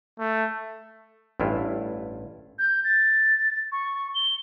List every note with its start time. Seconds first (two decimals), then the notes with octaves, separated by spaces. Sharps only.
0.19 A3
1.40 A1 G2 E4 F4
2.59 G6
2.84 A6
3.72 C#6
4.15 G7